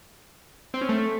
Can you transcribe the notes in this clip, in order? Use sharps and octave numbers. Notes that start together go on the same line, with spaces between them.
C4
C#4
A3